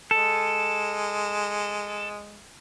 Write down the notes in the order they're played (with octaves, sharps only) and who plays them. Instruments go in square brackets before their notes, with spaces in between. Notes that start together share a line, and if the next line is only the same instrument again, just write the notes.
[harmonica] G#3 [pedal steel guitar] A4